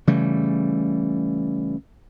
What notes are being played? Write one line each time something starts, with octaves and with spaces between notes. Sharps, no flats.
C#3 E3 G3 A3